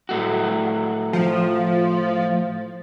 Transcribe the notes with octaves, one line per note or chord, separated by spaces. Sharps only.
A2 A3 F#4
F3